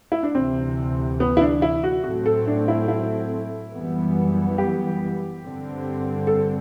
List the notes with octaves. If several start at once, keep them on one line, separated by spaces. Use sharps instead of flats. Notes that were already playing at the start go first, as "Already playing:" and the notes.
E4
D4
D2 C3 E3 C4
B3
E4
D4
E4
F#4
A2 F#3 A3 C4 F#4
A4
D4
E4
E4
F#2 E3 G3 B3
G4
G2 D3 G3 C4
A4